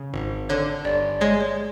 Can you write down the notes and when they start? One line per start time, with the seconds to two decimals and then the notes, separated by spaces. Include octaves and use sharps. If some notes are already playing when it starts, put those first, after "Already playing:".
Already playing: C#3
0.14 G#1
0.49 D3 C#5
0.85 G1 D5
1.21 G#3 C#5
1.41 C#5